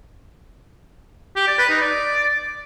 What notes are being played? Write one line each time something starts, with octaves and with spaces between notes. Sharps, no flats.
G4
D5
B4
D#4
D5